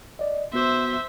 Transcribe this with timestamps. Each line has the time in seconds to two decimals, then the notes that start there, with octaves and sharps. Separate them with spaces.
0.19 D5 D#5
0.53 B3 F#4 C5 E5 D6